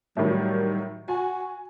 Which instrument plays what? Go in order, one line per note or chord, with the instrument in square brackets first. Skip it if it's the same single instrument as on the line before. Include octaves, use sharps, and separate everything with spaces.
[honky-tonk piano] A2 D#3 F#3 [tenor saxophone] G3
[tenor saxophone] F#4 [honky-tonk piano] G#5